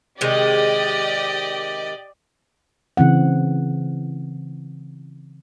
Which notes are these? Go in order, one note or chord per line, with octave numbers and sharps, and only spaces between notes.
C3 D#3 G#3 G4 D5 D#5
C#3 E3 C4 F#5